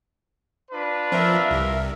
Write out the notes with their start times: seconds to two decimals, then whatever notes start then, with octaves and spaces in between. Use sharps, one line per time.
0.71 D4 F4 B4
1.12 F3 A#3 C4 A#4 E5
1.51 C2 C3